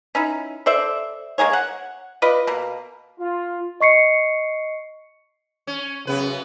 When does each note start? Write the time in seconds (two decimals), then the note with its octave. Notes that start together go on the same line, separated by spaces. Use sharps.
0.15 C#4 D#4 E4
0.66 A4 C5 D5 E5
1.38 G#3 A#3 G#4 C#5
1.53 F#5
2.22 F4 B4 D5 D#5
2.47 B2 A#3
3.19 F4
3.80 D#5 C#6 C7 C#7
5.67 C#4
6.07 F#2 C#3 B3 B4